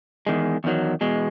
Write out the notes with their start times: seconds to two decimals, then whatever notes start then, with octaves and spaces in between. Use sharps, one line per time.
0.27 E2 D#3 G#3
0.64 E2 D#3 F#3
1.01 E2 B2 G#3